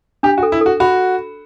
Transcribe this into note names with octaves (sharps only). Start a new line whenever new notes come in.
D4 G4
F#4
A4
E4
F#4 A4
F#4 B5